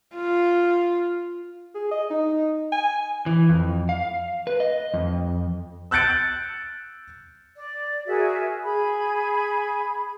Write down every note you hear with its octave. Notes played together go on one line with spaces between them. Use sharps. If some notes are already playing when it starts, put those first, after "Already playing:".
F4
G#4
D#5
D#4
G#5
E3
F2
F5
B4
D#5
F2
E6 F#6 G6 A6 C#7 D7
D5
F#4 G#4 A#4 E5
G#4 B5